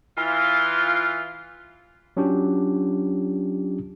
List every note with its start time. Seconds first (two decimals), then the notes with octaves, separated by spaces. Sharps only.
0.17 E3 F4
2.17 F#3 C#4 D4 F4 G4